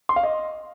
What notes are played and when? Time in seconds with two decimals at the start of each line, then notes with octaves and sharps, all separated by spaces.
0.09 C6
0.16 F5
0.23 D#5